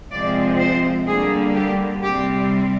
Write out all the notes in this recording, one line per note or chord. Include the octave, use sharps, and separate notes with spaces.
C3 F3 G#3 C4 D5
C5
D3 G3 A#3 G#4
G4
C3 G3 C4 G4